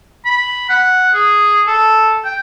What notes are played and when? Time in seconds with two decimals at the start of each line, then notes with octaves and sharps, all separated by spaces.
0.26 B5
0.70 F#5
1.14 G#4
1.67 A4
2.25 G5